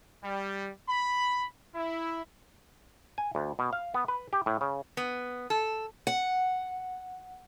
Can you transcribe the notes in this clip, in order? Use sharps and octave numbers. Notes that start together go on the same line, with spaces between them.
G3
B5
E4
G#5
D2
B2
F5
B3
B4
G4
A2
C#3
B3
A4
F#5